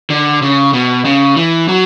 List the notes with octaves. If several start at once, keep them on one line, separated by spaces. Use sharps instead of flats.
D3
C#3
B2
C#3
E3
F#3